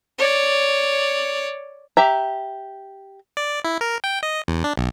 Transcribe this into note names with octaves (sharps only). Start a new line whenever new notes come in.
C#5 D5
G4 E5 A#5
D5
E4
A#4
G5
D#5
E2
D4
B1